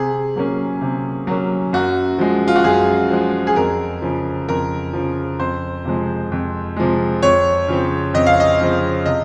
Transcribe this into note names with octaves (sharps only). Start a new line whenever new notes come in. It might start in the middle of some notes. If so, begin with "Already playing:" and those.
Already playing: C3 G#4
F#3 A#3 C#4
C3
F#3 A#3 C#4
F#2 F#4
F3 G#3
F4
F#4
F#2 G#4
F3 G#3
G#4
F2 A#4
C#3 F3
F2 A#4
F3
C#3
F2 C5
C3 F3 G#3
F2
C3 F3 G#3
F2 C#5
C#3 F3 C4
F2 D#5
F5
D#5
C#3 F3 C4
C3 D#5